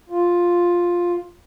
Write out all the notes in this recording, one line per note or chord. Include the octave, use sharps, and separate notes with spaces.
F4